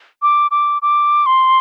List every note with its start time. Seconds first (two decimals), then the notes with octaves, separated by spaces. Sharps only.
0.22 D6
0.51 D6
0.82 D6
1.26 C6